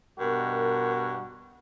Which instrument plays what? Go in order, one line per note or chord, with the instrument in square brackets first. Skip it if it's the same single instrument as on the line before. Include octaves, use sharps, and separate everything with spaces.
[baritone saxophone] G2 [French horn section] B2 A#4 [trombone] F#4